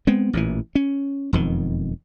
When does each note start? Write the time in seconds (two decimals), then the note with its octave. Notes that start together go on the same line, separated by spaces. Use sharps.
0.07 G#3 B3 C4
0.33 A1 A#2 C#3 E3
0.75 C#4
1.33 E1 F2 D#3